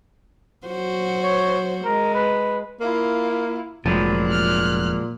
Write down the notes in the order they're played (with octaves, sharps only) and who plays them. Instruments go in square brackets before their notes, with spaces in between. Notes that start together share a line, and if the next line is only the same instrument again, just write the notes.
[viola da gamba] F#3 F#4 C5
[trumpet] C#5
[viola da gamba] G#3 [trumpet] A#4
[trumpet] B4
[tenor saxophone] A#3 [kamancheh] E4 F4
[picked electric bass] F1 [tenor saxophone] A#2 [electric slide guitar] F3 F#3 G#3 [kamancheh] B5
[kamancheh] F6 F#6